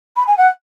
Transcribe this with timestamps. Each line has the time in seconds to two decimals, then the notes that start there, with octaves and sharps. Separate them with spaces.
0.16 B5
0.27 G#5
0.37 F#5